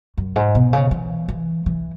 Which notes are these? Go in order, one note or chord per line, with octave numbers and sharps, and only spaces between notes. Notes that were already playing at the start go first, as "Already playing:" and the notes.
F#2
G#2
B2
C#3
E3
E3
E3